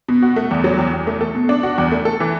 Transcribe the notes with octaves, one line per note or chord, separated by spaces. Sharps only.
B2
F#4
A3
E2
F#3
E2
E2
A3
A4
B2
D4
F#4
E2
A3
A4
E3